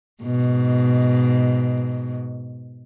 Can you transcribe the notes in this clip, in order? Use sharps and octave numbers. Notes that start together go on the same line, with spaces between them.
G#2 B2